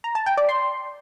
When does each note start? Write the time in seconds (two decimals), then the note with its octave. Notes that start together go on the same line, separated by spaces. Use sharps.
0.04 A#5
0.15 A5
0.26 G5
0.37 D5
0.49 C6